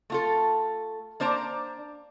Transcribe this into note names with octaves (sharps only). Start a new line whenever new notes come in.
A3 F4 A4
A#3 D4 C5 D5 A#5